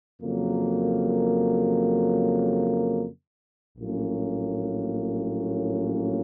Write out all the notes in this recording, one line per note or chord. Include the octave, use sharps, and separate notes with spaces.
F2 C#3 F#3 A#3
A#1 A2 F#3 A#3 C#4